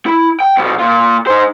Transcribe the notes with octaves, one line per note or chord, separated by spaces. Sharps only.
E4
G5
C2 B2
A#2 F4
D#4 C5